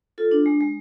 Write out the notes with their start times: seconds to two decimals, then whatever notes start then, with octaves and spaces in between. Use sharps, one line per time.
0.18 F4 A4
0.31 D4
0.46 G#3
0.61 G#3